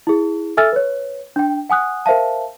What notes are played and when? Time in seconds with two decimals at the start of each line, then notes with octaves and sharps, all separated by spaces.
0.07 E4 G#4
0.57 A4 E5 G#5 E6 F6 A6
0.72 B4 C#5
1.36 D4 G5
1.69 F#5 G#5 D#6 F#6
2.06 A#4 C5 E5 F5 A5